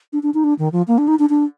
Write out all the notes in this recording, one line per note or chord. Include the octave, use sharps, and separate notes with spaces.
D4
D4
D#4
D4
D#3
F3
A#3
D4
D#4
D4
D4